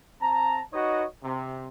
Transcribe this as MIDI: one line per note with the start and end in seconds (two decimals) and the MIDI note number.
0.22 0.61 60
0.22 0.61 81
0.22 0.61 82
0.73 1.04 63
0.73 1.04 66
0.73 1.04 71
0.73 1.04 73
0.73 1.04 75
1.24 1.67 48